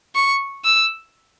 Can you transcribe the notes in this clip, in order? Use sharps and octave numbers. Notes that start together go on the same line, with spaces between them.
C#6
E6